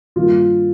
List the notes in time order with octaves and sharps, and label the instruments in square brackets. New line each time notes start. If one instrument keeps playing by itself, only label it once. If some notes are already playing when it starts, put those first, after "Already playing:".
[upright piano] G2 D#3 G3 A#3 F4